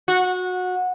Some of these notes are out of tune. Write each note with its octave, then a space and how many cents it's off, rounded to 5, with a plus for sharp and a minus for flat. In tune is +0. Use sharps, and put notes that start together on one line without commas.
F#4 -20